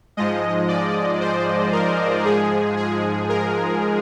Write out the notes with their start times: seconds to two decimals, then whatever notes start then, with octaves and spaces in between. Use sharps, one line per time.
0.17 G#2 F3 G#3 D#5
0.68 D5
1.21 C5
1.72 A#4
2.25 G#2 F3 G#3 G#4
2.77 G#4
3.29 A#4